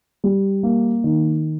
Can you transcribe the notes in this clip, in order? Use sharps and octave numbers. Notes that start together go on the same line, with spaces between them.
G3
A#3
D#3